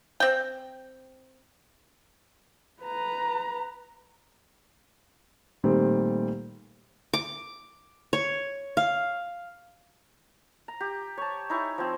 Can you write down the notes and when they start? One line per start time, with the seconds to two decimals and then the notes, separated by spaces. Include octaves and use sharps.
0.20 C4 G5
2.83 B4 A#5
5.64 A#2 D#3 G3 A3 C4
7.13 D6
8.13 C#5
8.77 F5
10.68 A#5
10.80 G4
11.18 C#5 A5
11.50 D#4 E4 C#5 G#5
11.78 F3 C4